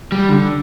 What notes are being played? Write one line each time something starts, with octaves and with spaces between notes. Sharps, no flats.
G3
D3